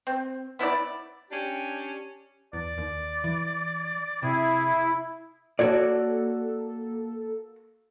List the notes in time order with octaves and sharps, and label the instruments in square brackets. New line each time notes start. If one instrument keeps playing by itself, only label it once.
[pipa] C4
B3 E4 B4 D5
[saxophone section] C#4 D4 G4
[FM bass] E2 [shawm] D5
[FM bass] D#2
E3
[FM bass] C3 [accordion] E4 [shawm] G#4
[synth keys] A#3 A4 [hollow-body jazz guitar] F#4 C#5 D5